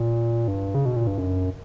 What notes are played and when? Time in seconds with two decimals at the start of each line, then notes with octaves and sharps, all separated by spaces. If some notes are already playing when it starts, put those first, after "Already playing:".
Already playing: A#2
0.48 G2
0.75 C#3
0.85 B2
0.96 A#2
1.07 G2
1.18 F#2